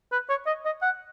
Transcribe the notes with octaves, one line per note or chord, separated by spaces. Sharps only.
B4
C#5
D#5
D#5
F#5